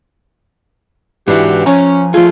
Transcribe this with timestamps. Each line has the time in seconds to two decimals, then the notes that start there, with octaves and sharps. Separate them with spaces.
1.28 G#2 E3 D4 F#4 G4
1.66 F3 C#4 G#5 A#5
2.14 F3 A3 F4 G#4